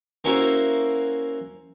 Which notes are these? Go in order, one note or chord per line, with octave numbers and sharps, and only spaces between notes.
A#3 C#4 E4 F#4 A#4 C5